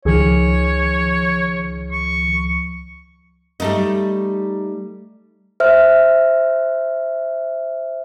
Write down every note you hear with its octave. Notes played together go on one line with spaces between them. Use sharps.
C#2 D#3 F3 G#4 C#5
C#6
G3 A3 D#4
C5 E5 F6